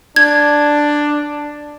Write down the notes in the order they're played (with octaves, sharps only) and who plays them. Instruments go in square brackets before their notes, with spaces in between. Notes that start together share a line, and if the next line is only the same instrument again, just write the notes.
[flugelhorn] D4 [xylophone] G#6